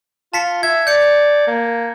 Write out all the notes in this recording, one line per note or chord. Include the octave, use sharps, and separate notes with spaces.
F4 A5 B6 C#7
E5 G#6
D5 G6 C#7
A#3